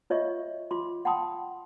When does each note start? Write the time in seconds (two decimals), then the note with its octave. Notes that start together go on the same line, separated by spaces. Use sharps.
0.10 F4 C#5 D#5 E5 C#6
0.71 F4 C6 D6
1.05 F#5 G5 A5 B5 C6 D#6